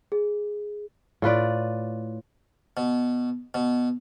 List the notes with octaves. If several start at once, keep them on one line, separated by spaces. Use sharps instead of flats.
G#4
A2 F4 B4 D5
B2
B2